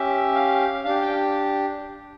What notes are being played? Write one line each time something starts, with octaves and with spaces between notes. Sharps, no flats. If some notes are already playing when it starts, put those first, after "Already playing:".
Already playing: C#4 G4 E5
F5
D4 G4 F5
G5